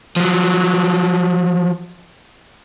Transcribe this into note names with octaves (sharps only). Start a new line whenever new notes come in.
F3 F#3